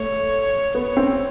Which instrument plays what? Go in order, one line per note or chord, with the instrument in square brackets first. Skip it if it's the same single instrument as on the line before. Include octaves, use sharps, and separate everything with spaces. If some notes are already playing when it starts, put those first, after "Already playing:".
Already playing: [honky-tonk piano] A3 [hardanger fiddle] C#5
[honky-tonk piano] B3 [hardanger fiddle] C#5
[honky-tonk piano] C4